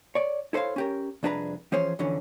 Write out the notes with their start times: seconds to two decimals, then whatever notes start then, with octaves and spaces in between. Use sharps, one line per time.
0.15 C#5 D5
0.53 E4 A4 C5 C#5 F5
0.76 C#4 G4 A#4
1.23 C2 F2 D4 G#4 B4 A#5
1.72 E3 F3 C#4 G#4 C5 C#5
1.99 F2 D3 E3 C#4